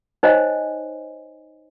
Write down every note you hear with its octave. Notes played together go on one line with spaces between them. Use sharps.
D#4 C5 C#5 D#5 G#5